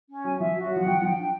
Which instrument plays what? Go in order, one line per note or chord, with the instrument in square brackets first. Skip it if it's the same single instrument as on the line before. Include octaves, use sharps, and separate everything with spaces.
[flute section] C#4
[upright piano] F#3 [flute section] G#5
[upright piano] F3 [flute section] E5
[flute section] F#4
[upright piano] F#3
[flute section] F#5
[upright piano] F3
[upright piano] F3 [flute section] G5
[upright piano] F3 [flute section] G5
[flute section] D4